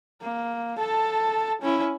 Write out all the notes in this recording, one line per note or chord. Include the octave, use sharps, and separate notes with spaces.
A#3
A4 A5
C#4 E4